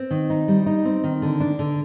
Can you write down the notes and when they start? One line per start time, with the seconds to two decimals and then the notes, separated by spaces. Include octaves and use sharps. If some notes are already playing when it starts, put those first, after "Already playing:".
Already playing: C4
0.11 D#3
0.30 D#4
0.48 G3
0.66 D#4
0.85 C4
1.04 D#3
1.22 D3
1.40 D4
1.59 D3